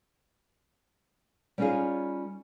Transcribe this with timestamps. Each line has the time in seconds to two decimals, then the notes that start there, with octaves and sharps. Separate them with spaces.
1.58 G3 B3 C#4 D#4 F4 G#4